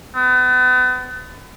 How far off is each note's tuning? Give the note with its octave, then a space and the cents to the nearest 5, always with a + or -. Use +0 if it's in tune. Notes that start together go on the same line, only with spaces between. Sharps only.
B3 +35